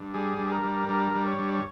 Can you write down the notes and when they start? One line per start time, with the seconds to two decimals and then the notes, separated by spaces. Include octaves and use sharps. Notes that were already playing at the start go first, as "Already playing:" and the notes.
Already playing: G2
0.14 G3 G#4
0.39 G2
0.47 G#4
0.52 A#4
0.63 G3
0.89 G2 A#4
1.15 G3
1.27 C#5
1.39 G2
1.54 C#5